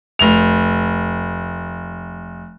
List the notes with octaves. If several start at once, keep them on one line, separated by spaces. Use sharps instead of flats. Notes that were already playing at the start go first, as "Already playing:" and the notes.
F1 F7